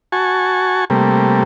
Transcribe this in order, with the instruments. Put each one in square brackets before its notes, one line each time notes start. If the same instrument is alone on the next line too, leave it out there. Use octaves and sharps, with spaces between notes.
[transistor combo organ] F#4 G#5 A5 C#6
C3 G3 A3 A#3